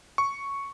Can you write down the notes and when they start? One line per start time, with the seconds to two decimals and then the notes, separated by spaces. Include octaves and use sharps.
0.18 C#6